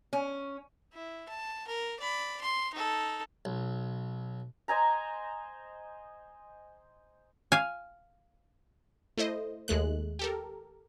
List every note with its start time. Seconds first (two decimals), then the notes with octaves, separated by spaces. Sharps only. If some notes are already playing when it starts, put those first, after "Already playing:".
0.13 C#4
0.93 E4
1.29 A5
1.67 A#4
2.00 D5 B5
2.41 C6
2.74 D#4 A4
3.45 B1
4.68 C5 D#5 G#5 A#5
7.52 F5 G#5
9.17 A3 E4 C5 D#5
9.68 D#2 G#3 A3 F#6
10.19 G4 A4 A#4